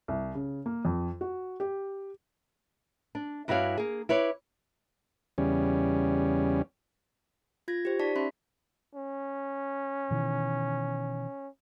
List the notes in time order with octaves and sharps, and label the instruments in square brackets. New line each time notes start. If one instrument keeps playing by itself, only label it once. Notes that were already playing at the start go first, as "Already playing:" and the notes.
[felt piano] C2
C#3
A#3
F2
F#4
G4
[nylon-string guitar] D4
G2 E4 F#4 C#5 D5 F5
A#3 G#4
E4 B4 C#5 D5
[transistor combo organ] E2 C#3 G3 C#4
[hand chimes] F4 G#6 A#6
G4 C5
D#4 D5 A5 C#6 B6
C#4 D5 E5 B5 C6
[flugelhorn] C#4
[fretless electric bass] B2 D#3 E3